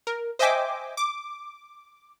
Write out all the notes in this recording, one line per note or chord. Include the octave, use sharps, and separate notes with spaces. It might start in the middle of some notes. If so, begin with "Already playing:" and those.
A#4
C5 D#5 E5 G5 G#5 D6
D6